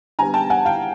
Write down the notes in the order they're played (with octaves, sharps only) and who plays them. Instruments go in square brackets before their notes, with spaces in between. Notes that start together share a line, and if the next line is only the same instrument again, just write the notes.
[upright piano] D3 G3 B3 G#5 A#5
G5 A5
F#5 G#5
F5 G5